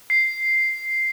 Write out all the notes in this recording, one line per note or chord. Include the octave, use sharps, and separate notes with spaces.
C7